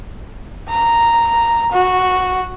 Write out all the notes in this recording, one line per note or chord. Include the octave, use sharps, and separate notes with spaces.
A#5
F#4